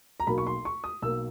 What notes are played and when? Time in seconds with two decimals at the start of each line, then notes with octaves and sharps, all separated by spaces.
0.20 A#5
0.27 B1 B2 F#3 A#3 B5
0.38 C#6
0.47 C6
0.65 C#6
0.84 D#6
1.02 B1 B2 F#3 A#3 E6